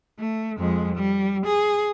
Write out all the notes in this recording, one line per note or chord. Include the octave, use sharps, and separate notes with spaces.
A3
F2 G#3
G3
G#4